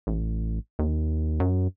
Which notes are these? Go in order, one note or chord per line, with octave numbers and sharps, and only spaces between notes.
A1
D#2
F#2